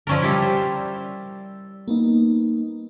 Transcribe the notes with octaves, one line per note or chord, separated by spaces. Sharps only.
F3 C#4 A#4 D5 E6 A6
G3 E4
C5
A#3 B3 D#4